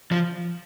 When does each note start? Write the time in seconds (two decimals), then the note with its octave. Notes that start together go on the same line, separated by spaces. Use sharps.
0.12 F3